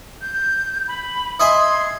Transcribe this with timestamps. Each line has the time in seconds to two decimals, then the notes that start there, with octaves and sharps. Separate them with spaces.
0.21 G6
0.88 B5
1.40 D#5 E5 G#5 C6